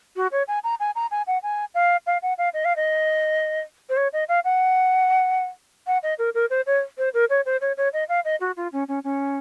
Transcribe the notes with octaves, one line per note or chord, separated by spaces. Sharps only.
F#4
C#5
G#5
A#5
G#5
A#5
G#5
F#5
G#5
F5
F5
F#5
F5
D#5
F5
D#5
C5
C#5
D#5
F5
F#5
F#5
D#5
A#4
A#4
C5
C#5
C5
A#4
C#5
C5
C#5
C#5
D#5
F5
D#5
F#4
F4
C#4
C#4
C#4